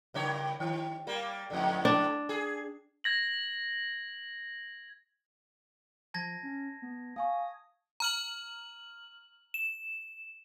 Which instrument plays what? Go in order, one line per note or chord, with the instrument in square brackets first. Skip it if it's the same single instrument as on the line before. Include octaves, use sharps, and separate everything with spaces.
[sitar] G2 C#3 C#5
D#3
G3 A#3
F2 A2 D3
[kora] D4
[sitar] G#4
[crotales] G#6 A#6 F#7
[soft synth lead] F3 [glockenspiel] A5 G#6 A#6
[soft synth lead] C#4
B3
[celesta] F5 G#5 C#6 [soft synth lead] D#6
[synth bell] A#5 F6 F#7
E7